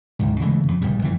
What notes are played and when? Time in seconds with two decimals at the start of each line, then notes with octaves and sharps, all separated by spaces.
0.19 D2 G#2
0.40 C#3 E3 G#3 A3
0.68 F2
0.82 D1 A#1 C#3 G3
1.02 G1 F2 E3